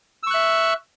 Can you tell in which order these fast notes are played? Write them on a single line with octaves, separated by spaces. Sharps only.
E6 C#6 F#6 E5